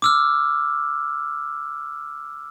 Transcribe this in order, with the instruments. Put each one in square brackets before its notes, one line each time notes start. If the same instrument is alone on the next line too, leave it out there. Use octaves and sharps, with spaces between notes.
[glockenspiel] D6 E6 F6